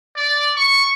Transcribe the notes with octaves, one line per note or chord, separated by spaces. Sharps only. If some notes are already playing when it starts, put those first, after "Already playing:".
D5
C#6